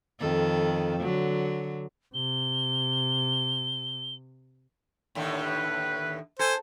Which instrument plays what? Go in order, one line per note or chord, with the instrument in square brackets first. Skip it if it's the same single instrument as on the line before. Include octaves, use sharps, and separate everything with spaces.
[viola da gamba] F2 D#3 A4
D3 F#3
[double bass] C3 [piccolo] G7
[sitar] D#2 A2 D3
[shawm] B4
[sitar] A4 [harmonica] C5 [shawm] G#5